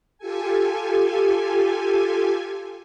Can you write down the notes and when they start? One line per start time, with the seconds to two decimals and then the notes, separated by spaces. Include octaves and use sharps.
0.18 F4 G4 A4 G#5